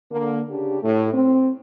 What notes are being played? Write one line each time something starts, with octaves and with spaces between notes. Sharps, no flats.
D3 A#3
C#3 D4 G4
A2
C4